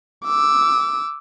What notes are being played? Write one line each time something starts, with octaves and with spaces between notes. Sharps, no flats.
D6 E6